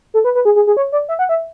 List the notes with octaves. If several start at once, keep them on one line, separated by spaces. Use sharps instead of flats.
A4
B4
B4
G#4
G#4
G#4
C#5
D5
E5
F#5
E5